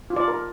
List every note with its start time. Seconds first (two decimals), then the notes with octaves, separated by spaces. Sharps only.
0.10 F4
0.16 D5
0.28 A#4